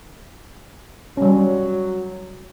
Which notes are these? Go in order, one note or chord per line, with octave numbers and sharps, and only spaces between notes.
F#3 G3 C#4